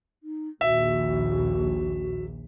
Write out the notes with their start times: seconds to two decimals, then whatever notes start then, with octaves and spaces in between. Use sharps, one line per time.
0.23 D#4
0.61 A#1 D#2 F#4 E5